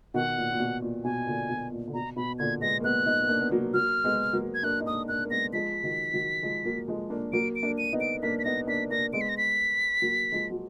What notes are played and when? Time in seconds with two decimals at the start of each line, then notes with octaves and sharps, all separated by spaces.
0.14 B2 D#3 F#5
0.37 A#2
0.53 A#2
0.60 B2
0.82 A#2
1.04 B2 G#5
1.26 A#2 D3
1.50 B2
1.72 A#2
1.88 D3
1.94 B2 A#5
2.16 B2 B5
2.39 A#2 D3 G#6
2.61 G#3 B3 A#6
2.80 A#3
2.84 G#3 B3 F#6
3.06 B3 D#4
3.22 B3
3.28 A#3 D4
3.41 B3
3.51 F#3 A#3
3.73 F#3 A#3 F6
4.04 G#3 B3
4.33 F#3 A#3
4.54 G#6
4.63 A#3 D4 F#6
4.80 D#4
4.87 A#3 D4 D#6
5.08 A#3 D4 F#6
5.24 A#3
5.31 G#3 B3 A#6
5.53 F3 G#3 B6
5.83 D#3 F#3
6.13 D#3 F#3
6.43 F3 G#3
6.65 F#3 A#3
6.88 F3 G#3
7.10 A#3 D4
7.33 F#3 A#3 D7
7.56 D7
7.63 A#3 D4
7.78 D#7
7.93 B3 D#4
8.00 D7
8.23 A#3 D4 B6
8.39 B6
8.45 B3 D#4 A#6
8.67 A#3 D4 B6
8.90 A#3 D4 A#6
9.13 G#3 B3 D7
9.21 B6
9.29 A#6
9.37 B6
10.02 F#3 A#3
10.32 F3 G#3
10.51 F#3